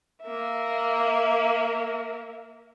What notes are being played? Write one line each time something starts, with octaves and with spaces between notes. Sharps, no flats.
A#3 E5